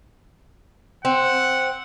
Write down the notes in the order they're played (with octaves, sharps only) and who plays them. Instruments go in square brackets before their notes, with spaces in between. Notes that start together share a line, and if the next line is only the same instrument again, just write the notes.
[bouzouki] C4 [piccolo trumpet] F#5